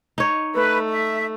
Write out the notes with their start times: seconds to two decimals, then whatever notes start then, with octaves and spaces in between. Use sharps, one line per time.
0.18 D#4 C#5
0.54 A3 B4
0.88 E5